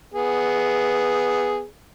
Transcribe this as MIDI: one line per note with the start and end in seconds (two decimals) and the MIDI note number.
0.14 1.64 59
0.14 1.64 68